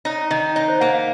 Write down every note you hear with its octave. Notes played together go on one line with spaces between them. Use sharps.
D#4 C#5
D#3 D#5
D#4 C#5
C5
A#3 F#5
F5